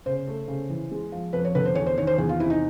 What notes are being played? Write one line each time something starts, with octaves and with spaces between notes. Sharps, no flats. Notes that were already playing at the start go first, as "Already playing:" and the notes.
C#3 C5
A3
C#3
E3
G#3
F3
F2 B4
C#5
D3 B4
C5
E2 C#5
C5
D#3 C#5
C5
E2 G#4
F4
C3 E4
D#4